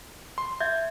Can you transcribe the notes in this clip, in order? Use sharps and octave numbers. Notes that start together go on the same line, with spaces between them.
C6
E5 G6 G#6